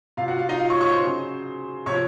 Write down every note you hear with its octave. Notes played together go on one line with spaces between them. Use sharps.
C3 F#3 F4 F5
F#4 F#5
F4 F5
D#4 D#5
F4 F5
C#5 C#6
C#5 C#6
C5 C6
C#3 F#3
C3 F3 C#5 C#6